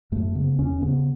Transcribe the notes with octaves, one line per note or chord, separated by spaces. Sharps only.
F#2 A3
C#3 B3
E2 C#4
C#3 B3